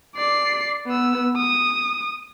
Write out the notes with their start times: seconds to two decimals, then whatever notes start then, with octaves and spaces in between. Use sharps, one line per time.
0.16 D5 C7
0.87 B3 E6
1.37 D#6